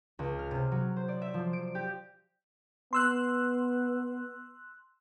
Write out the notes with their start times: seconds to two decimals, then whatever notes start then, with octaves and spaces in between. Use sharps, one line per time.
0.19 C#2
0.39 F6
0.51 C3
0.72 F#3
0.96 C5
1.08 D5
1.22 E5
1.34 F3
1.53 D7
1.75 G4
2.93 B3 C6 E6 F#6